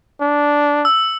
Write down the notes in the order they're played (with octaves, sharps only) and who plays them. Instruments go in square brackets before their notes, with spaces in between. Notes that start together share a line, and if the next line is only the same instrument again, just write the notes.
[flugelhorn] D4
[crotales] E6